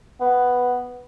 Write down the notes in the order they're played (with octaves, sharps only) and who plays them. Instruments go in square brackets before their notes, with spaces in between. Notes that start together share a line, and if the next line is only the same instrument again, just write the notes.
[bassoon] B3